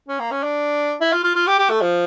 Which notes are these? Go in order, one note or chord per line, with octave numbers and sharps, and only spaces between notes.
C#4
A#3
C#4
D4
E4
F4
F4
F4
G4
G4
A3
F3